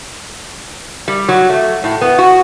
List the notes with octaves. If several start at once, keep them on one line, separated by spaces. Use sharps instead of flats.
G3
F#3
A3
A2
B3
F#4